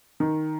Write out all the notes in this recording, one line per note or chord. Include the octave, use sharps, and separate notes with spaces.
D#3